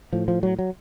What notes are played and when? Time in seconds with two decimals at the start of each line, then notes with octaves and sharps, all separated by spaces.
0.13 A2 F3
0.28 F3
0.43 F#3
0.59 F#3